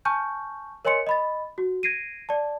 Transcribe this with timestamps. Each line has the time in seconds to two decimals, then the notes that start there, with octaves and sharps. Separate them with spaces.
0.05 G#5 A5 C#6 F6 G6
0.85 A#4 C#5 D#5 G#5 C6 C#7
1.07 D#5 B5 A6
1.58 F#4
1.83 G#6 A#6 C7 D7 D#7
2.29 D5 A5